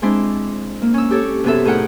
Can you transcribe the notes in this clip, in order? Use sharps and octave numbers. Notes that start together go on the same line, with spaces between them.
G#3 C4 D4 E4 C6
A#3
C#4 E6
G4 A4 C#5
F#2 C3 B3 G#4 A4 E5
A2 D#4 G#4 A#4 F#5 G5